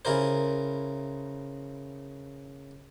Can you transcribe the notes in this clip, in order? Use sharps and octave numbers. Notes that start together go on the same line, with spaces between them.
C#3 E4 A#4 C5